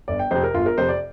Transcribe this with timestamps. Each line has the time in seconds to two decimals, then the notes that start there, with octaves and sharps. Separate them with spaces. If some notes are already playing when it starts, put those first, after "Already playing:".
0.08 G1 D5
0.19 G5
0.31 F2 C3 C5
0.43 A#4
0.54 G1 F4
0.66 A#4
0.78 F2 C3 C5
0.89 D5